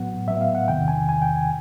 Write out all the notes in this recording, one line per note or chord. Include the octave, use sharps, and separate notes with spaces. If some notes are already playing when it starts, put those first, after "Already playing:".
Already playing: A2 F#3 B3 F#5
A2 F#3 B3 E5
F5
F#5
E2 C3 D#3 G5
G#5
E2 C3 D#3 G#5
G5
G#5